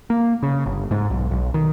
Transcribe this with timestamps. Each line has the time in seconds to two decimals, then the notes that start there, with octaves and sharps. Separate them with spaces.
0.10 A#3
0.43 C#3
0.66 G1
0.91 G#2
1.10 B1
1.31 B1
1.54 D#3